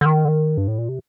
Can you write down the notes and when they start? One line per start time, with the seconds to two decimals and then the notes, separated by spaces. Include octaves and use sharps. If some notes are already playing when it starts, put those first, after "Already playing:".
0.01 D3
0.06 D#3
0.25 D3
0.28 D#3
0.57 G2
0.68 A2
0.78 A#2
0.89 C3